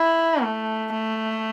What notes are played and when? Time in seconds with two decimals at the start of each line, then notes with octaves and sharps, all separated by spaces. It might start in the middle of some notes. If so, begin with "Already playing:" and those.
Already playing: E4
0.43 A3
0.93 A3